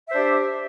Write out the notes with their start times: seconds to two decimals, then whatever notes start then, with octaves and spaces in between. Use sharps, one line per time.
0.08 E5
0.11 C5
0.14 D4
0.17 G4